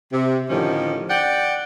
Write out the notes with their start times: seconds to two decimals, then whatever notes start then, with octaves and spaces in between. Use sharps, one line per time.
0.12 C3
0.50 A2 D3 D#3 F3 C#4 G4
1.09 D5 F#5 G5